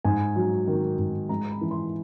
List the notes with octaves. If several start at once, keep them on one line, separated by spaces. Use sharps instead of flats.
G#2 G#5
F#3
D#3
G#2
G#3 A#5
B5
E3
C6